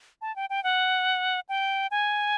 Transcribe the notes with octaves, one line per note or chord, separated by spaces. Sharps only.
A5
G5
G5
F#5
G5
G#5